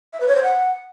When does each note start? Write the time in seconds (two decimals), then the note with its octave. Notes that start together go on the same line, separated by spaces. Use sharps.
0.13 E5
0.20 B4
0.28 C#5
0.35 C5
0.43 F#5